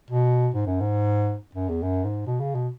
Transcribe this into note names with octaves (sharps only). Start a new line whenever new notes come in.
B2
G#2
F#2
G#2
F#2
E2
F#2
G#2
B2
C#3
B2